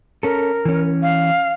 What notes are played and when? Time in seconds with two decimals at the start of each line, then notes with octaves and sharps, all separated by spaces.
0.23 C#4 A4 A#4
0.65 E3 C#4
1.02 F5